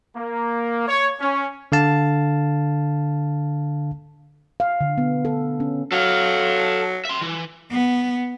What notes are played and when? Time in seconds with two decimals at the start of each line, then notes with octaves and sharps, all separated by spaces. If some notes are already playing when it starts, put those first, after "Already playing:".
0.16 A#3
0.88 C#5
1.20 C#4
1.72 D3 F5 A5
4.60 F5
4.81 D3
4.98 B3
5.25 A4
5.60 C#4
5.92 F#3 A4 F5
7.05 E5 C6
7.21 E3
7.71 B3